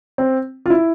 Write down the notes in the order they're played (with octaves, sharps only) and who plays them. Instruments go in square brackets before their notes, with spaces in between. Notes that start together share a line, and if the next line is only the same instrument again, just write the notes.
[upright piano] C4
F4
E4